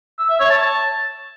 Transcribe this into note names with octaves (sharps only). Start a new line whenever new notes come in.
E6
E5
C#5
A5